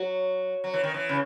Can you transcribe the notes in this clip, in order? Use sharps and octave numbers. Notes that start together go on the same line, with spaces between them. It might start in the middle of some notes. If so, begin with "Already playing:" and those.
Already playing: F#3
F#3
E3
D#3
E3
C#3